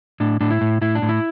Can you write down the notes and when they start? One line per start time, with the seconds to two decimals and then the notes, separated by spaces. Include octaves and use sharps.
0.20 A2 D4
0.41 A2 D4
0.50 E4
0.61 A2
0.81 A2 E4
0.95 D4
1.02 A2
1.09 E4